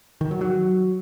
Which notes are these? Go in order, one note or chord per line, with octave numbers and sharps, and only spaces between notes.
D#3
F#3
F#3